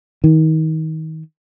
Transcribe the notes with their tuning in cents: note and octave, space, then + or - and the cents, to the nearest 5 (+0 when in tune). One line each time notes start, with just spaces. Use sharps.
D#3 +30